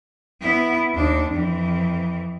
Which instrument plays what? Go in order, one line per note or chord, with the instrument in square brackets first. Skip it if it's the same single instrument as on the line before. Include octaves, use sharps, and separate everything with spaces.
[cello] B3 E4
D#2 D4
F2 E3